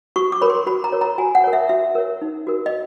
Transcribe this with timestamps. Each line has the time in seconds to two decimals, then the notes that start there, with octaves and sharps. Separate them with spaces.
0.16 F#4 C#6
0.32 D6
0.41 A#4 C#5 B5
0.50 C6
0.67 F#4 B5
0.84 A#5
0.92 A#4 C#5
1.01 A#5
1.18 F#4 G#5
1.35 F#5
1.44 A#4 C#5
1.53 E5
1.69 F#4 E5
1.95 A#4 C#5
2.22 D#4
2.47 F#4 A#4
2.66 D#5